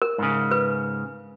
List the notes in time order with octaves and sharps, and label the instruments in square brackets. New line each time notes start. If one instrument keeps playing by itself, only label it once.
[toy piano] A#4
[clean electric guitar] G#2 C#3
[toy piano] B4